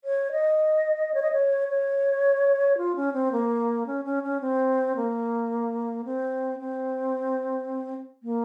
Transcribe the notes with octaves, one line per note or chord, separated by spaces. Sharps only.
C#5
D#5
C#5
D#5
C#5
C#5
F4
C#4
C4
A#3
C#4
C#4
C#4
C4
A#3
C4
C4
A#3